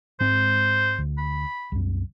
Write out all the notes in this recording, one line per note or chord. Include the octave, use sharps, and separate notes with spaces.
G#2 G#3 C4 C5
D2
B5
C2 F#2